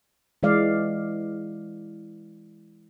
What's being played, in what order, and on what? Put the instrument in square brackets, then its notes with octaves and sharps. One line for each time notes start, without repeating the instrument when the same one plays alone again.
[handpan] E3 G#3 D5 F5